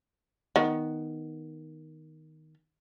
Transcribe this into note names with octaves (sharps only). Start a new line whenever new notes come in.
D#3 B3